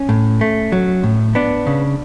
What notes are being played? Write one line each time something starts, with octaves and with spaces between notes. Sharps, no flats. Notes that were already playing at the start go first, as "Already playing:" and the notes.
Already playing: C#4
A2
A3
F#3
A2
B3 D4
C#3